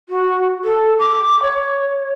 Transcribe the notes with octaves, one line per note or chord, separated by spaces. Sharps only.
F#4
A4
D6
C#5